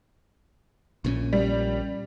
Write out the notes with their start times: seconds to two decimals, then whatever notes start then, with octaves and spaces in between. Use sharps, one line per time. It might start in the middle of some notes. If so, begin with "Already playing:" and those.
1.04 A#1 A#2 C#4
1.33 G3